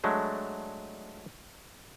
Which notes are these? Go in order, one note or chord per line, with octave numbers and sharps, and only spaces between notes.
F#3 G#3 A3 D4